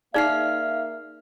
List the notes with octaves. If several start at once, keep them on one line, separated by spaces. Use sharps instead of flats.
A#3 D#4 G#4 D5 E5 F5 F6 C7